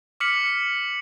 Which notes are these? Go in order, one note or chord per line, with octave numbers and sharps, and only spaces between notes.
D6 F6 B6 C#7 F#7